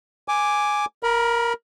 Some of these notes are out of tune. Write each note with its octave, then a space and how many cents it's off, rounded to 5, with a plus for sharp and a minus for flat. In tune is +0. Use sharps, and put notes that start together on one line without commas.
G#5 +0 D6 +0
A#4 +5 B5 -30